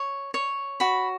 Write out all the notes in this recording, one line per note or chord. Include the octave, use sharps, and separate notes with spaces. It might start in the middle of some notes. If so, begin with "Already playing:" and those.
Already playing: C#5
C#5
F#4 B5